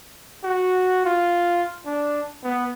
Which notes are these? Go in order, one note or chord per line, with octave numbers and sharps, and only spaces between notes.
F#4
F4
D4
B3